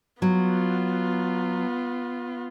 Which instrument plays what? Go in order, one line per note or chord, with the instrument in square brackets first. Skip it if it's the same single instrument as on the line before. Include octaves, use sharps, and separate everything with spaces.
[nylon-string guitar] F#3 [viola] B3 F4